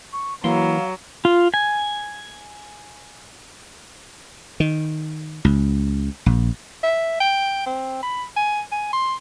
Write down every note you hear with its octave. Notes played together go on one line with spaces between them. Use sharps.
C#6
E3 F#3 A#3 E4 F5 C6
F4
G#5
D#3
C#2
A#1
E5
G5
C4
B5
G#5
G#5
C6